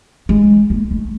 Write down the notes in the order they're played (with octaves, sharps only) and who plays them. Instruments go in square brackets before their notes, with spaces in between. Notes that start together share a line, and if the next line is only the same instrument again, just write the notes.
[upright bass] G#3
A#3
A3